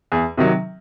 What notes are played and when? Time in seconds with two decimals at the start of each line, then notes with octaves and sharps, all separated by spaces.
0.12 E2
0.37 C3 D#3 F#3